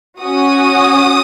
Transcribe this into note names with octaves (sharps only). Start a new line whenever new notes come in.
C#4 F#4 D#6